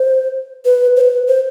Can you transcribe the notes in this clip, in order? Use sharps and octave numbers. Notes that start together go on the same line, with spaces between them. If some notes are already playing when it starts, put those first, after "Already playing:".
Already playing: C5
B4
C5
B4
C5